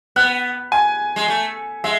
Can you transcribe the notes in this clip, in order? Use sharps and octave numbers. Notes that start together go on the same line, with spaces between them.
B3 F#6
G#5
G#3
A3
G#3 E5